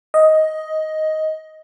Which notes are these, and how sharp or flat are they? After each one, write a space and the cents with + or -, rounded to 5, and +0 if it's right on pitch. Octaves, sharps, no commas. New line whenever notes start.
D#5 +10